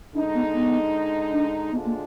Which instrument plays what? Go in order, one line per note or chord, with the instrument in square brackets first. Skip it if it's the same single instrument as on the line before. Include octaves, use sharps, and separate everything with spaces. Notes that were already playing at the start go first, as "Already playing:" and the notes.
[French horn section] D3 G#3 D#4 [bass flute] D4
[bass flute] B3
B3
D4
[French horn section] D2 D3 G#3 D4 F4 [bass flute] B3
[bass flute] A#3